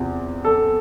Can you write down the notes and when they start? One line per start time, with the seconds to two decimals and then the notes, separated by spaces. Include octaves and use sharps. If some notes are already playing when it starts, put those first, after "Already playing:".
Already playing: E2 C3 F3
0.45 A4